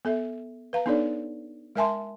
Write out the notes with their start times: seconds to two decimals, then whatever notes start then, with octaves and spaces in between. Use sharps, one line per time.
0.05 B3 A4 E5
0.73 B4 F5 A#5
0.86 B3 D4 D#4 A4 C#5 D5
1.76 G#3 A#4 E5 G#5 A5 C6